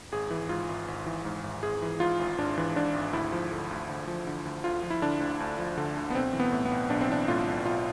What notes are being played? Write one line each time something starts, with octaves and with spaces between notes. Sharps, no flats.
G#1 G#4
E3
G#2 F4
G#1
G#1
E3
G#2
G#1
G#1 G#4
E3
G#2 F4
G#1
G#1 D4
E3
G#2 D4
G#1
D2 E4
F3
D3
D2
D2
F3
D3
D2
D2 F4
F3
E4
D3 D4
D2
D2
F3
D3
D2
B3
B1 C4
E3
B3
A2
B3
B1
B1 D4
C4
E3 D4
A2 F4
B1
B1 F4